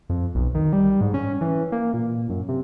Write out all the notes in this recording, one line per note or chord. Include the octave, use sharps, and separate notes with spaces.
F2
B1
D#3
G3
G#2
C#4
E3
A#3
A#2
F#2
C3